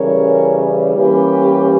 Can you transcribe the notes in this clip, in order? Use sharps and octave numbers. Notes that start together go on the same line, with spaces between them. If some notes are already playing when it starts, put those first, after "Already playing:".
Already playing: C#3 E3 G3 C#4 A#4 C#5
E3 G3 A#3 C#4 G4 B4